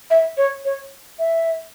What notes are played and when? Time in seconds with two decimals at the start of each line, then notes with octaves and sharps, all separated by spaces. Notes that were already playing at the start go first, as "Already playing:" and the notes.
0.10 E5
0.37 C#5
0.65 C#5
1.19 E5